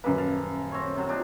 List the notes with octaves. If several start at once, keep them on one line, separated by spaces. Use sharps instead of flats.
D#1 F#2 A#3 B4
F5 A5 A#5
C4 C#5
C3 F#3
A#2 D4 D#4